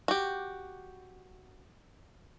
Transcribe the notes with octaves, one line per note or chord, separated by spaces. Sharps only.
F#4 G4